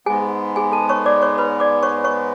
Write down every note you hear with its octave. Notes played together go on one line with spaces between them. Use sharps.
G#2 G#3 B3 G#4 G#5
G#4 G#5
A4 A5
C#5 C#6
D5 D6
C#5 C#6
B4 B5
D5 D6
C#5 C#6
C#5 C#6